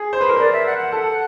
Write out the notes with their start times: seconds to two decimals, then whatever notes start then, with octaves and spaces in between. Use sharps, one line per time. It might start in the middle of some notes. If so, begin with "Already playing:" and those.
Already playing: G#4
0.13 C5
0.21 B4
0.29 A#4
0.37 B4 D5
0.53 E5
0.66 F#5
0.78 F#5
0.92 A4